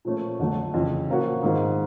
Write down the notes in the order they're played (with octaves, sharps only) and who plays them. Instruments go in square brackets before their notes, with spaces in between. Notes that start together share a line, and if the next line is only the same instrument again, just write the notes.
[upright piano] A#2 F3 A3 C#4
F2 D3 F#3 A3 D4
F2 C#3 E3
A#2 F3 A#3 C#4 F#4
G#2 D#3 G#3 C4 F4